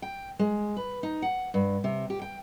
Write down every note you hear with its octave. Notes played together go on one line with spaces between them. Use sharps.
G5
G#3
B4
D#4
F#5
G2
C3
G4
G5